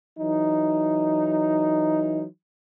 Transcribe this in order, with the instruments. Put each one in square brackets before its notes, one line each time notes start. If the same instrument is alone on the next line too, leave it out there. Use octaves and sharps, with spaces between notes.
[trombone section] E3 F#3 D#4